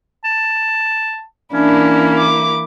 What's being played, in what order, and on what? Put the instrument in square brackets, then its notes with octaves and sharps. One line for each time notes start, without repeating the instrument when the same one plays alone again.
[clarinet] A5
[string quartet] E3 A#3 E4 [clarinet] C#4 [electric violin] D4
[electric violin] D6